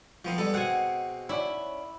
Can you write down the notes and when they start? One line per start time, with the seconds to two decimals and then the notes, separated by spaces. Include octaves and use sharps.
0.25 F3 A3 B3 C4 A#4
0.38 G3 G#3 B3 A4
0.54 B2 C4 F#5 G#5
1.29 C#4 E4 D5 F#5